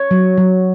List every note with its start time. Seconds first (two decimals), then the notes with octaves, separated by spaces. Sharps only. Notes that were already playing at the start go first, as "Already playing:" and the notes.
Already playing: C#5
0.11 F#3
0.38 F#3